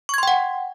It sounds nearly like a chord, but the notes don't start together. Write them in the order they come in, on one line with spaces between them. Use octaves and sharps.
C#6 G#6 C6 G5 F#5